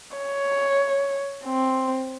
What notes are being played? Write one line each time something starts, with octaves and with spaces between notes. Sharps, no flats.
C#5
C4